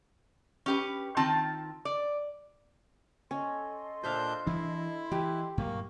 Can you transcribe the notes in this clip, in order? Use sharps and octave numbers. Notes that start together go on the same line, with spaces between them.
C#4 G4 B4
D#3 C4 F4 G5 A5
D5
C#4 A4 D#5 C6
A#2 D4 C5 E5 F5 G6
E3 D4 E4
E3 G4
G2 A#2 F#3 A#3 C#6